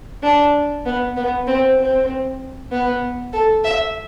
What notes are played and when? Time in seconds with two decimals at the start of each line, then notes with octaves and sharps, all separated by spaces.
0.23 D4
0.85 B3
1.16 B3
1.47 C4
1.79 C4
2.71 B3
3.33 A4
3.64 E5